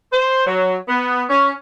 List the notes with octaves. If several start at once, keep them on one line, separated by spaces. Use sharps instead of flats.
C5
F#3
B3
C#4